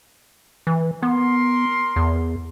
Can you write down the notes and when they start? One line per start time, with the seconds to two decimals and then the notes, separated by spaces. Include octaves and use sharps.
0.67 E3
1.03 B3 A#4 C6
1.96 E2